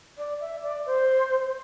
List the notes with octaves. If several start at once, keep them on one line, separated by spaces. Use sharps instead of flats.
D5
E5
D5
C5